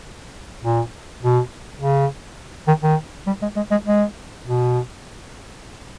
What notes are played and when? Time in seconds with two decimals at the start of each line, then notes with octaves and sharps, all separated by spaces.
0.63 A#2
1.22 B2
1.80 C#3
2.68 D#3
2.82 D#3
3.27 G3
3.42 G#3
3.57 G#3
3.71 G#3
3.86 G#3
4.44 B2